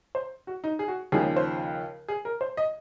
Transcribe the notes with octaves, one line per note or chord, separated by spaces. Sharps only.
C5
F#4
D#4
G#4
F#4
D#2 C#3 F3 G#4
C5
G#4
A#4
C5
D#5